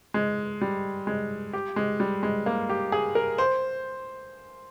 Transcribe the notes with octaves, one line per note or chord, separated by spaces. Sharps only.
G#3
G3
G#3
G4
G#3
G3
G#3
A#3
G4
G#4
A#4
C5